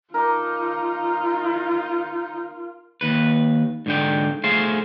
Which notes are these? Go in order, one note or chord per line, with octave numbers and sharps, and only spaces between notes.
D#4 F4 A#4 A5 D6
D#2 B4
G#2 D3 G5
A3 G#4 C5 F5